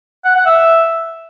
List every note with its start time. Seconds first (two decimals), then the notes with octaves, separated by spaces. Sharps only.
0.25 F#5
0.35 F#5
0.46 E5